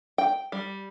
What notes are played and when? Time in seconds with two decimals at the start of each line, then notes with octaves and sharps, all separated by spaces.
0.18 G5
0.52 G3